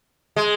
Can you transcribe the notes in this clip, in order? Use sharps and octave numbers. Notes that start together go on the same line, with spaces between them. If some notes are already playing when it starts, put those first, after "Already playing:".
G#3